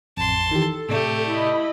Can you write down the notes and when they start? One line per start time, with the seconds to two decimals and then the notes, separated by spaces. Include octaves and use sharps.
0.17 A1 F2 A5 C6
0.51 D#3 E3 G4 A4
0.89 A2 C3 A3 G4 D5
1.29 E4 D#5 B5